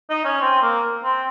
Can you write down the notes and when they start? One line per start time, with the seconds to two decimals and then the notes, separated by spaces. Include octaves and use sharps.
0.10 D#4
0.25 C#4
0.41 C4
0.62 A#3
1.03 C4